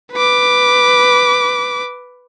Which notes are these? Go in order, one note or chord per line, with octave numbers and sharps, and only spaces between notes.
B4 D6